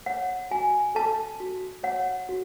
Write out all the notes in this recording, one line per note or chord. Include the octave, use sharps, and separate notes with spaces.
C#5 F#5
F#4 G#5
A4 A5
F#4
C#5 F#5
F#4